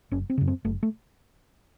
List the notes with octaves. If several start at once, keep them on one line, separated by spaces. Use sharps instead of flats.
F#1 C#4
C4
F#2 C#3
C4
F#1 A3
A3